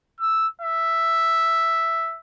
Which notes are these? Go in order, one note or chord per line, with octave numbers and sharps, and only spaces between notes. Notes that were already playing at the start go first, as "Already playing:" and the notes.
E6
E5